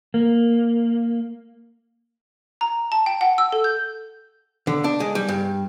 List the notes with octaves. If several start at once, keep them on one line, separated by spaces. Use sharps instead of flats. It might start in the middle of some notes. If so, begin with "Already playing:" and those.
A#3
A#5
A5
G5
F#5
E6
A4
G6
D3
D4
G#3
G3
G2